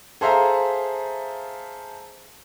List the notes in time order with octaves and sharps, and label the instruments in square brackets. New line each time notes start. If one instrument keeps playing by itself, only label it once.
[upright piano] G#4 A4 C5 E5 F5 A#5